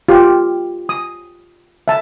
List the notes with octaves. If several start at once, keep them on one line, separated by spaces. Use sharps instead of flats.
F4 G4
D#6
E5 A5